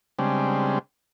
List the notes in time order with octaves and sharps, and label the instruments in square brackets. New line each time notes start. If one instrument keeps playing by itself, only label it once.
[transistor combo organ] C#3 G3 G#3 C4 D4